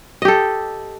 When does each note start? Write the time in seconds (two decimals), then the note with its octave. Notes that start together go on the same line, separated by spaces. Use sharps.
0.22 D#5
0.25 G4
0.28 A4